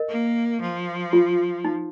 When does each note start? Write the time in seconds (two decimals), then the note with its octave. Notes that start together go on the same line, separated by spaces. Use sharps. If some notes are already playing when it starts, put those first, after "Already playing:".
Already playing: A#4 D#5
0.08 A#3
0.61 F3
1.13 F4
1.65 D#4